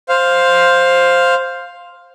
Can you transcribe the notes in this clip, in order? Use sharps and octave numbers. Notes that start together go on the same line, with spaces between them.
C5 F5